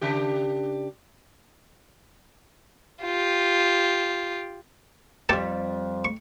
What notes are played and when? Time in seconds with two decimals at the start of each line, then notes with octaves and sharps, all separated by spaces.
0.01 C#3 D4 G4
3.03 F4 G4
5.29 F2 G3 G4 A4 A5
6.05 C#6